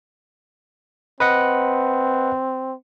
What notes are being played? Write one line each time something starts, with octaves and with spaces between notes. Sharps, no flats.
C4 B4 D#5 F#5